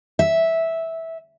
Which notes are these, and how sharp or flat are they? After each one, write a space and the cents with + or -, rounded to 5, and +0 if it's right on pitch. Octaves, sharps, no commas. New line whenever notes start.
E5 -10